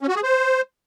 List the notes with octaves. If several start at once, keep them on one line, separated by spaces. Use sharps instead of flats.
C#4
F#4
G#4
C5